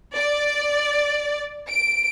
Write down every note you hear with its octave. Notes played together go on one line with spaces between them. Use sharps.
D5
D7